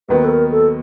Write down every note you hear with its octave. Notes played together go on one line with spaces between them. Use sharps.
D#2 D#3 F#3 B3 B4
A4
A#4
A4